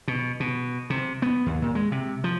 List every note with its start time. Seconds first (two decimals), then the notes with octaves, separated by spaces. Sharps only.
0.08 B2
0.40 B2
0.90 C3
1.22 B3
1.46 D#2
1.62 A#2
1.75 G#3
1.92 C3
2.24 F3